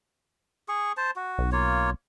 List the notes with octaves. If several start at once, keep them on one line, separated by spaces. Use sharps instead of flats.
G#4 C#6
C5 A5
F#4
B1
A#3 F4 C#5